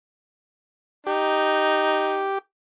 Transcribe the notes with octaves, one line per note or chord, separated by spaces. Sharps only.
D#4 G4